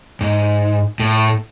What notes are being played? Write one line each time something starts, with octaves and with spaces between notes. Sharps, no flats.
G#2
A2